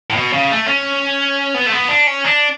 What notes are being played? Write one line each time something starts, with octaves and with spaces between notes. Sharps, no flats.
A2
B2
C#3
A3
C#4
B3
A3
B3
D4
C#4
D4